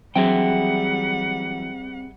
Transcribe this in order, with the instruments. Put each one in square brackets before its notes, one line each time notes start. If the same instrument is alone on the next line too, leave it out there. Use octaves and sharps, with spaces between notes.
[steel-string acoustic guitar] E3 F#3 [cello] G3 F#5 [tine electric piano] C4 [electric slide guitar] G#4 E5 G5